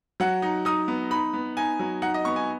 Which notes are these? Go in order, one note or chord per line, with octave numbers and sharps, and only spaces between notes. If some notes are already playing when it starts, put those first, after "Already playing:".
F#3 F#5
D#4
D#4 D#6
B3
D#4 B5
B3
D#4 G#5
F#3
D#4 F#5
D#5
B3 C#6
G#5